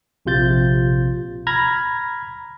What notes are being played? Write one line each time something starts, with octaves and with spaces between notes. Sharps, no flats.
A#1 C3 F4 G6 A6
A#5 B5 F6 G#6 A#6